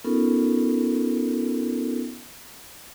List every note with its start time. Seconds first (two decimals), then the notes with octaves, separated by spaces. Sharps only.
0.04 B3 C#4 D#4 F4 A4 A#4